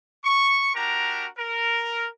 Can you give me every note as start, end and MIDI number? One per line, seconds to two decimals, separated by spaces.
0.25 0.72 85
0.75 1.26 62
0.75 1.26 66
0.75 1.26 67
0.75 1.26 70
0.75 1.26 82
1.39 2.08 70